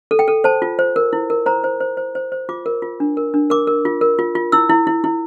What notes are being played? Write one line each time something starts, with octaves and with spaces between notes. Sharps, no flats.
A4
G5
A4
C5 A5
F4
C5
A#4
E4
A#4
C5 A#5
C5
C5
C5
C5
C5
F4 D6
A#4
F4
D4
A#4
D4
A#4 D6
A#4
F4
A#4
F4
F4
E4 E6
E4
E4
E4